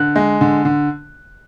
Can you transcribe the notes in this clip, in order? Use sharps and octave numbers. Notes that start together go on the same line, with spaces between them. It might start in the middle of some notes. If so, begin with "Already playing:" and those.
Already playing: D3 F#6
G#3
D3
D3